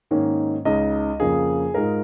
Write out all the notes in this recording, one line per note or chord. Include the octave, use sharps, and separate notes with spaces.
G#2 D#3 A#3 C#4
C#2 C#3 G#3 D#4 D#5
F2 C#3 A#3 F4 G#4
G#2 G#3 F4 A#4